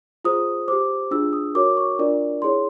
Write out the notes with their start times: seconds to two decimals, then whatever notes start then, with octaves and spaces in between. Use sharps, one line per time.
0.25 F4 G#4 C5 D#6
0.68 C5 D6
0.72 G4
1.11 D4 F4 G#4 E6
1.33 D#6
1.55 F#4 A#4 C#5 D6
1.77 C#6
1.99 D4 F4 A#4 D5
2.42 E4 G#4 C#5 C6